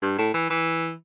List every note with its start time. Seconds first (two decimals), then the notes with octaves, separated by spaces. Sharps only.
0.02 G2
0.18 A2
0.34 E3
0.50 E3